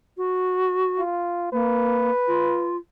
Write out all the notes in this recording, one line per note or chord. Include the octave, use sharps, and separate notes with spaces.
F#4
F4
A#3 B4
F4